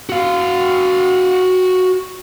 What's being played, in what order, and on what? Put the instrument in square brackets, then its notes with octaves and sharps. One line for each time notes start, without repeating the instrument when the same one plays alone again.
[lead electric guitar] F#4 F5